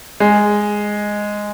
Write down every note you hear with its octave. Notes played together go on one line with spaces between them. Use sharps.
G#3